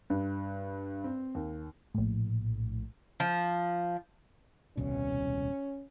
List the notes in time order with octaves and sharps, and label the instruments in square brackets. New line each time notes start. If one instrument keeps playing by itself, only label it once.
[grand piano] G2
C4
D#2
[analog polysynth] A#1 A2
[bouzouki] F3
[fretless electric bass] D#1 C2 B2 [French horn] C#4